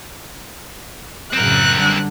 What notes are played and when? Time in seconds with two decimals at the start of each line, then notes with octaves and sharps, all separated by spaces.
1.33 F#2 A2 C#3 C4 A#4 F#6
1.79 D3 G3